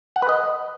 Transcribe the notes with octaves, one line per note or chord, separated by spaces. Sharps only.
F#5
B4
D#5